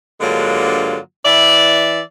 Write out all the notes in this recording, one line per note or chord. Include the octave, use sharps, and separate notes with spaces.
G2 D3 F#3 G#3 A#3 F4
E3 D5 E5